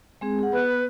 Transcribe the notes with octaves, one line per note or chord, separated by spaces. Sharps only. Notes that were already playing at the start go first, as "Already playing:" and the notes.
G#3 C4 G#4
G#4 F#5
B3 B4